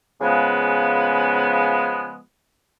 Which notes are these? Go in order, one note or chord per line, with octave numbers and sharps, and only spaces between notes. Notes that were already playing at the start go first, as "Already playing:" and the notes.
C#3 F3 G#3 B3